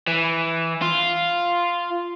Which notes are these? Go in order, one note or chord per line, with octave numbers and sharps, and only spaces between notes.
E3
F4